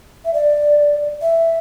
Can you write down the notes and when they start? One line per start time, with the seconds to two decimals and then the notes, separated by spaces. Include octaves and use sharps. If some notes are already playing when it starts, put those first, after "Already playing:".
0.25 E5
0.34 D5
1.21 E5